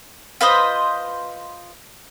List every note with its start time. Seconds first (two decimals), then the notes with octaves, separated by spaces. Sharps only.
0.41 F4 B4 C5 D#5